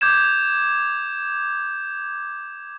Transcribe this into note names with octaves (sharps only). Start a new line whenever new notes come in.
D6 G6 G#6 E7